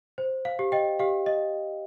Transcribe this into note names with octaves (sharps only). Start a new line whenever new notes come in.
C5
F5
G4
D#5 G5
G4 F5
D#5